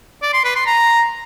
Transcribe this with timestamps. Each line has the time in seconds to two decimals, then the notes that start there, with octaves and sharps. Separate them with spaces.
0.22 D5
0.33 C6
0.44 B4
0.55 C6
0.66 A#5